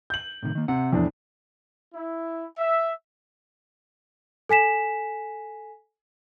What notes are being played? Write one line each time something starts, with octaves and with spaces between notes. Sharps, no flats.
G6 F#7
A2 C3 D#3
D#3 A#3
C3 F#5
E2 A2 F3 D4
E4
E5
A4 G#5 B6 E7